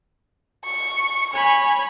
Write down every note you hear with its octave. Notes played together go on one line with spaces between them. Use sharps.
C#6
C#5 G#5 B5